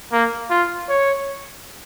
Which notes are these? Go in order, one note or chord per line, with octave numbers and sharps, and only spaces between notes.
A#3
F4
C#5